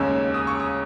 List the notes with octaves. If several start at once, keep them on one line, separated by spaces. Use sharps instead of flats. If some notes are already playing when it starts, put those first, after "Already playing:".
Already playing: D#2 C#3 G#3 C#4 E6
D#6
C#6
D#6